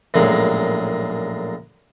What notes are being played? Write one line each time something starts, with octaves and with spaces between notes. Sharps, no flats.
A#1 F#2 A2 G#3